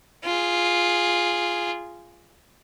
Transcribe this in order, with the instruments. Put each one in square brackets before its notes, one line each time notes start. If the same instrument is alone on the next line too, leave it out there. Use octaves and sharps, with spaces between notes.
[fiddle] F4 G#4